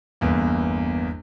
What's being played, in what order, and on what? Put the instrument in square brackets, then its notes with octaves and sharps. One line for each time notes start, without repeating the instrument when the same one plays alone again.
[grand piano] G1 E2 A#3